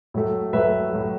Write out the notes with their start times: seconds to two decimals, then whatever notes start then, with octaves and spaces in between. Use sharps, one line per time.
0.14 A2 F#3 A3
0.53 A2 F#3 A3 B4 E5
0.91 A2 F#3 A3